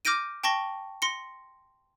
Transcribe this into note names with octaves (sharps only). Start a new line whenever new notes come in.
D6 F6 G6 A#6 D7 D#7
G5 A5 C#6 A#6 G7
C6 A#6 C#7